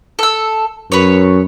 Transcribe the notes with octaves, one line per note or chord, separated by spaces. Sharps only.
A4 E6
F#2 B4 C#5